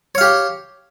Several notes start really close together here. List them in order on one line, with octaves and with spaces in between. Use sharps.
C#5 F5 G4